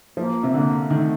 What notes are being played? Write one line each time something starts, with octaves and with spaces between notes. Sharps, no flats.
F3 A#3
C3
D3 A#3
D#3 A3